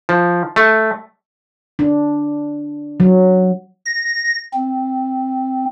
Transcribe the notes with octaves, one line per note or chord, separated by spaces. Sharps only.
F3
A3
D4
F#3
A#6
C4